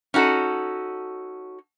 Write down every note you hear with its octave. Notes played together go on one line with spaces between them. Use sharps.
C#4 D#4 F#4 A4